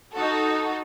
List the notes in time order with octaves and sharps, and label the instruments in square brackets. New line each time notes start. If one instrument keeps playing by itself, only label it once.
[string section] D#4 F#4 A4